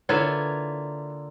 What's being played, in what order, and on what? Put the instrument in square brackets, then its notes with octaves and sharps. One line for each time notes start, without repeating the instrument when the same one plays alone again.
[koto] D3 A#3 F4 [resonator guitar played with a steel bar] E4 B4 C#5